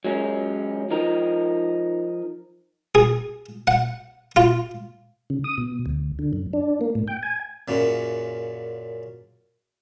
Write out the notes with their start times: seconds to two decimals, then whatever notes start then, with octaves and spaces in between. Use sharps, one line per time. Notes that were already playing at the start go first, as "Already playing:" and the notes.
0.04 F#3 G#3 C#4
0.91 F3 D#4 A#4
2.95 G#4
3.67 F#5
4.36 F4
5.30 C#3
5.44 D#6
5.58 B2
5.86 D2
6.19 D3
6.33 F#2
6.53 D4
6.81 A#3
6.95 A2
7.08 G5
7.23 G#5
7.68 F#2 A#2 C#3